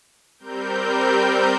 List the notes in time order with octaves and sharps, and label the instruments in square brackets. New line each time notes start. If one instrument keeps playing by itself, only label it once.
[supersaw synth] G3 C4 A#4 G6